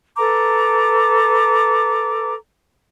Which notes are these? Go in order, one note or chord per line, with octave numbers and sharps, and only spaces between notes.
A4 B4 A#5 D6